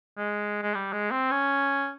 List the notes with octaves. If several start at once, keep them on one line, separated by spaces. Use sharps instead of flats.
G#3
G#3
G3
G#3
C4
C#4